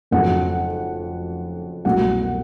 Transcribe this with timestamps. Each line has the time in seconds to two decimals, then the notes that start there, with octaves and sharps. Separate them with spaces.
0.11 F1 F2 C#3 F#3 F#5
1.85 C2 B2 F#3 A3 F#5